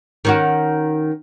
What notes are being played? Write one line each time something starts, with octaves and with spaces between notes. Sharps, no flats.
D#3 C#4 F#4